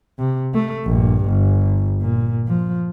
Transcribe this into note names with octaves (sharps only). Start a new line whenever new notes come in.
C3
A3
A#1 G2
G1
A#2
F3